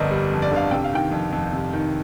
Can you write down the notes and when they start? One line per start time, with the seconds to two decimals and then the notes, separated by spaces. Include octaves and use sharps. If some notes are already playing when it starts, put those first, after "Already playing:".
Already playing: G1 F2 D3 A#4 D5 D#5
0.11 G3
0.32 F2
0.42 D5
0.52 D3 F5
0.71 C3 G5
0.84 F5
0.93 D#3 G5
1.12 F2
1.32 F2
1.53 C3
1.73 D#3